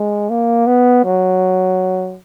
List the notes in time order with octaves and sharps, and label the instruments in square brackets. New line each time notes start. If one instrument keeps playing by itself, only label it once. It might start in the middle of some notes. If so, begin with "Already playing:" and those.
Already playing: [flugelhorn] G#3
A#3
B3
F#3